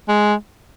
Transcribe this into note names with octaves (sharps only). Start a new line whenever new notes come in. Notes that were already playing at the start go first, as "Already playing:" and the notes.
G#3